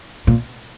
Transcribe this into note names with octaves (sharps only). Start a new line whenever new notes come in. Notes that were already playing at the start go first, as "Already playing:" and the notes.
A#2